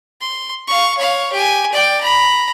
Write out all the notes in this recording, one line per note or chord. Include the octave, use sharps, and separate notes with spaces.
C6
F5 C#6
C#5 F5
G4 G#5
D5 G5
A#5 B5